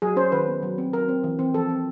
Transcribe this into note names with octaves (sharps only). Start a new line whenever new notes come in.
F#3 G#4
C#4 C5
D#3 B4
B3
F#3
C4
F#3 A#4
C4
E3
C4
F3 A4
C4